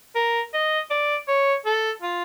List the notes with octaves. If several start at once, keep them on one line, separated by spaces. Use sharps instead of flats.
A#4
D#5
D5
C#5
A4
F4